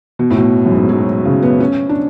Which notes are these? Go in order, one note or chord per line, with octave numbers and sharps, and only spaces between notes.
B2
A2
B2
F#2
G#2
F#3
C#3
B3
C#4
D4